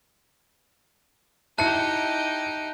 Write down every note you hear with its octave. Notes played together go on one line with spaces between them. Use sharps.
D#4 E4 G4 A5 F#6 C#7